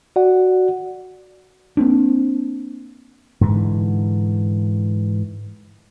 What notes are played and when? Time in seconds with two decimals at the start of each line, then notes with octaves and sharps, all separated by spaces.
0.16 F#4 D5 F#5
1.77 A#3 C4 D4
3.41 G#2 D3 E3